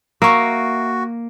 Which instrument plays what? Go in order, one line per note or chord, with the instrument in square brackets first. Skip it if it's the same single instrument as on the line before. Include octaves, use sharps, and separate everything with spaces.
[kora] A#3 [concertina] F#4 [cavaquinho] E5 C#6